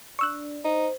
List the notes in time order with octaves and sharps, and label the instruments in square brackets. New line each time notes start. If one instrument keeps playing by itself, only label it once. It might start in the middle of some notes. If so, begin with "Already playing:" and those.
[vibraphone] D4 D5 [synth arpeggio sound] C#6 E6 F#6
[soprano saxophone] D#4 [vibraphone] C5